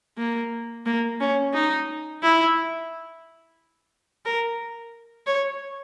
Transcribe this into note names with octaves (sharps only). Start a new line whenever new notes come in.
A#3
A#3
C#4
D#4
E4
A#4
C#5